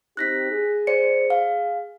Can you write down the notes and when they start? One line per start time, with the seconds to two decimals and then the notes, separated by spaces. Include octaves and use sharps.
0.17 C4 D#4 G4 F#6 A#6 B6
0.50 G#4
0.87 C5 D5 C#7
1.30 F5